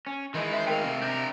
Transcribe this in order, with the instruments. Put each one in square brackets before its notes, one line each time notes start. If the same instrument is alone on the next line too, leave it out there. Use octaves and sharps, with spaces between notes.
[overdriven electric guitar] C#4
[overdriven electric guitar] D#3 G#3 [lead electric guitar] E3
[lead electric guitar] B4 C5 [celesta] E5
[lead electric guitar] A3 F5 [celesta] A#4 G5
[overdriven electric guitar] C3
[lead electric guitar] D4 A#4 [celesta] G6